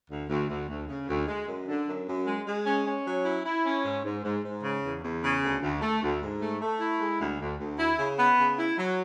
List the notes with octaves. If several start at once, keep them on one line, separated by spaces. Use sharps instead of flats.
D2
D2
D2
D2
C#3
D2
G#3
F#2
D3
F#2
F#2
G#3
G#3
C#4
C#4
F#3
E4
E4
C#4
G#2
G#2
G#2
G#2
C#3
E2
E2
C#3
D2
D2
A3
D2
G#2
A3
A3
E4
G#3
D2
D2
D2
E4
C#3
B3
C#3
E4
F#3